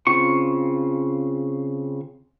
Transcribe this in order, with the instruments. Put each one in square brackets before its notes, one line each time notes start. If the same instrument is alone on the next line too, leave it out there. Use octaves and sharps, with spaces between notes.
[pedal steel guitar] C#3 C4 F4 C#6